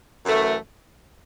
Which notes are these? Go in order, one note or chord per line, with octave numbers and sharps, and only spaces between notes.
F#2 E3 A3